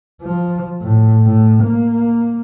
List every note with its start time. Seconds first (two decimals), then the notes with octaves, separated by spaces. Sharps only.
0.21 F3
0.82 A2
1.26 A2
1.63 A#3